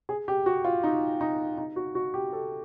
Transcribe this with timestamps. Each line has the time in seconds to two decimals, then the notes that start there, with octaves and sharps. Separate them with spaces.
0.09 G#4
0.28 G4
0.46 F#4
0.65 F4
0.84 D#4
1.21 D#4
1.58 D#4
1.76 F#4
1.95 F#4
2.14 G4
2.33 A4